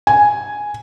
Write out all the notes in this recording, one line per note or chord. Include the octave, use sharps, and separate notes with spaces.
G#5